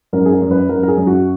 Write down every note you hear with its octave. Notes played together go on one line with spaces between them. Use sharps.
F#2 A#4
G#4
A#4
F#2
B4
F#2 A#4
A#4
G#4
F#2
F#4